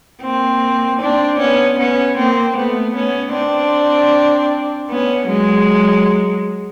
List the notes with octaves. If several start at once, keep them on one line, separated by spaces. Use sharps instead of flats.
A#3 C4
C4 D4
B3 C#4
B3 C#4
A#3 C4
A3 B3
B3 C#4
C4 D4
B3 C#4
F#3 G#3